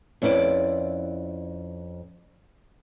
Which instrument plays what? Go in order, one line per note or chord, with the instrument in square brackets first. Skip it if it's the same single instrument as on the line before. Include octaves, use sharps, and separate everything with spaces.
[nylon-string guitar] F2 C#4 E4 B4 D5